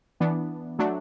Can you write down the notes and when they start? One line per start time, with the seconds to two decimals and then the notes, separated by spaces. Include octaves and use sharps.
0.20 E3 B3 D4
0.79 F#3 A3 D4